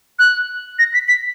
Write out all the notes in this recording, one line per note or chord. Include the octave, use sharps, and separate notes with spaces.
F#6
A#6
B6
B6